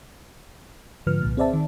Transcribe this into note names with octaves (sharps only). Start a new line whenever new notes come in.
G#2 D3 F3 B4 F6
C2 A#2
C4 G#4 C5 D5 E5 A5
D#3